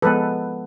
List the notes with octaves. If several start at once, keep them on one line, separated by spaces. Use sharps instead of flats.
F3 G#3 B3 A4 B4